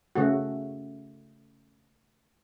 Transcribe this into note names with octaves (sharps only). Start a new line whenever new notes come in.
C#3 A3 F#4